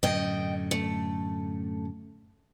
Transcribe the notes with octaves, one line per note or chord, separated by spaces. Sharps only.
F#2 A2 D3 D#5 G5
A3